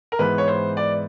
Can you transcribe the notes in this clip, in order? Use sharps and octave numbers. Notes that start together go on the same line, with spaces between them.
A#4
G#2 E3 G#3 B3 B4
C#5
C5
D5